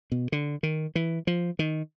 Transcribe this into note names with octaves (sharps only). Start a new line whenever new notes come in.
B2
D3
D#3
E3
F3
D#3